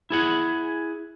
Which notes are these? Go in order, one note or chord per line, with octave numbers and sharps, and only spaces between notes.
E4 G#4 F#5